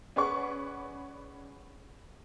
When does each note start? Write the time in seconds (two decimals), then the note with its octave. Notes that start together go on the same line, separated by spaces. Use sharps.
0.16 C#4 G#4 B4 D5 F#5 C#6